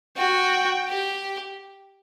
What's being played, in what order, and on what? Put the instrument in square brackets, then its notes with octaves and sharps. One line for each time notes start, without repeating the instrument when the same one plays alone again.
[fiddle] F#4 [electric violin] G5
[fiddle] G4